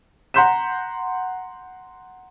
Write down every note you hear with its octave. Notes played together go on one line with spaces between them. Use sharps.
F#5 A#5 C6 G6 B6 E7